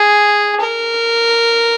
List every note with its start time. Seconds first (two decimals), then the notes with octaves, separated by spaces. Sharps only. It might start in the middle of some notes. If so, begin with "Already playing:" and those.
Already playing: G#4
0.60 A#4